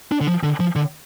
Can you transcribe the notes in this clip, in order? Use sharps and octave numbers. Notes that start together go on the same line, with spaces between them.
D4
D3
F3
D3
F3
D3